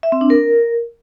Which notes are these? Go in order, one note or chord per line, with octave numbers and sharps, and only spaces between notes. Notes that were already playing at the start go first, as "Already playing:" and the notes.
E5
C4
D4
A#4